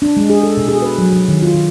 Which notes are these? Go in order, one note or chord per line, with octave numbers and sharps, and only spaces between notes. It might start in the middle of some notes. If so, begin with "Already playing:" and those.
D4
G#3
G#4
A4
B2
G#4
B4
F#3
F#3
D#3
F4
D#3